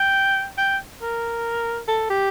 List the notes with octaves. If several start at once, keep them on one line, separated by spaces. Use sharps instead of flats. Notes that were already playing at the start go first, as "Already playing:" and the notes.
Already playing: G5
G5
A#4
A4
G4